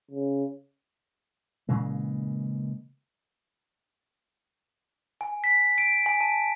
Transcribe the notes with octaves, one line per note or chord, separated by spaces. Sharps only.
C#3
A#2 C#3 E3 G#3
G#5
B6
D7
G#5
A5